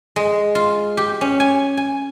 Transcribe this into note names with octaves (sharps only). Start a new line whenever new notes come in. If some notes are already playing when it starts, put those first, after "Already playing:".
G#3
F4
G4
C#4
G#5
G#5